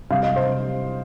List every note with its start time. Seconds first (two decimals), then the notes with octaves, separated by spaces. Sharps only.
0.10 C3 G3 F5
0.23 D#5
0.36 C5